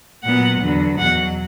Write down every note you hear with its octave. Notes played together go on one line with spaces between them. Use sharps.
A#2 F#3 B3 F#5
E2 D3 F#3 B3
E2 B2 F#3 F#5